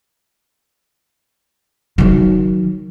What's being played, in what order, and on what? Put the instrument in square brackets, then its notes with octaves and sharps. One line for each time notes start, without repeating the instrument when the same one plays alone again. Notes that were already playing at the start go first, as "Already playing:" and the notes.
[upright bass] D#3 F#3